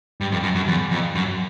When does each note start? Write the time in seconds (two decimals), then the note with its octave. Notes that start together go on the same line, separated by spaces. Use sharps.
0.21 G2
0.32 F2
0.43 F#2
0.55 F#2
0.68 E2
0.91 F2
1.15 F#2